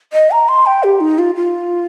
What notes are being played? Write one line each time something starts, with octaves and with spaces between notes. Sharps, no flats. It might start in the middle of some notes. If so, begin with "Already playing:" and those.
D#5
A#5
C6
G5
G4
D#4
F4
F4